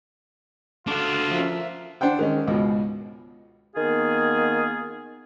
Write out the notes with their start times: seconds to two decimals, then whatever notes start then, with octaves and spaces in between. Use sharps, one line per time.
0.87 D3 D4 F4 F#4
1.31 F3 A#4 E5
2.01 D4 C5 F#5 G5
2.19 D#3 G#3 C#4
2.47 C#2 G#2 B2
3.76 D#3 A#3 B3 F4 G#4